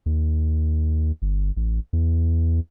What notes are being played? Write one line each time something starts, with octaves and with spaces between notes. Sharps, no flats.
D#2
G1
A1
E2